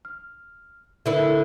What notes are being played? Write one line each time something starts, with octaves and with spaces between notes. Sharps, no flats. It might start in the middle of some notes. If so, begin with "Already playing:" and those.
F6
D3 E4 A#4 B4 E5